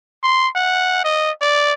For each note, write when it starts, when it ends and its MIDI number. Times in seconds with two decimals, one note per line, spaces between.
0.23 0.48 84
0.56 1.04 78
1.04 1.31 75
1.41 1.73 74